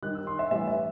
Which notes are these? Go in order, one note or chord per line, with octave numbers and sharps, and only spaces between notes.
D#3 G3 D#4 F#6
E6
C6
E5
A2 E3 G3 E5
E5